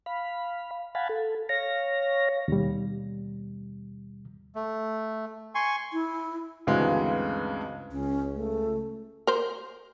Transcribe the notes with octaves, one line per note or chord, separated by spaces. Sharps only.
F5 B5
F5 F#5 G#5 A5 B5
A4
C#5 F5 A#6
D#2 B2 G3
A3
G#5 C6 C#6
E4
D2 G2 C#3 E3 G#3 C4
C#2 C#4
A3
A#4 C5